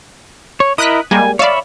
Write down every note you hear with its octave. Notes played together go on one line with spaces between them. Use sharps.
C#5
E4 A#4 D#5 D#6 F#6 B6
G3 G#3 A#3 G#5
C#5 D5 E5 F5 B5